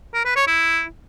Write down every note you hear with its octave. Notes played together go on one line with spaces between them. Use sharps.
A#4
B4
C#5
E4